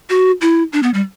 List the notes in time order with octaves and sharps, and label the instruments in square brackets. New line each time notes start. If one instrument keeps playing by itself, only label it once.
[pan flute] F#4
E4
D4
B3
G3